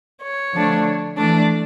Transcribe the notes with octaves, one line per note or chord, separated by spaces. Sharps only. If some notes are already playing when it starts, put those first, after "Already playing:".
C#5
D3 F3 A3 D4
E3 A3 D4 D5